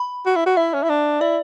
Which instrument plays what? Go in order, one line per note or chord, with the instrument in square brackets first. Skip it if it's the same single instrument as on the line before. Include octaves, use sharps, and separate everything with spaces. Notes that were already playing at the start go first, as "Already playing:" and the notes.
Already playing: [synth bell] B5
[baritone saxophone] F#4
E4
F#4
[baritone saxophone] E4 [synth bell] E5
[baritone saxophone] C#4
E4
D4
[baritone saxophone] E4 [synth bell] D5